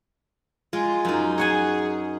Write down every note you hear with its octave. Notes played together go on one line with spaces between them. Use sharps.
G#3 F4
F#2 D#4
G#4 C#5 F#5 G#5